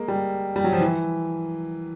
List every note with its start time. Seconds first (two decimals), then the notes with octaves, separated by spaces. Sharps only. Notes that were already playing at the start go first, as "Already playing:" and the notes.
Already playing: G#3 A#3
0.08 G3
0.56 G3
0.64 F#3
0.73 F3
0.81 E3